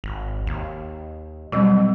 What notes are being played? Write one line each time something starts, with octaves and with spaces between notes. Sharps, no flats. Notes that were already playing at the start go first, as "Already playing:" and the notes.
G#1
D#2
B2 F#3 G3 C4